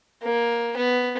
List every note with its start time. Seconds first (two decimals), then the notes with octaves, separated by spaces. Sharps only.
0.23 A#3
0.77 B3